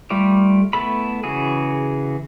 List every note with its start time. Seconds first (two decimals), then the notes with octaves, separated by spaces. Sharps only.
0.10 G3 A3 F4 D5
0.73 A3 B3 E4 A4 B5
1.24 C#3 E3 F#4 G#4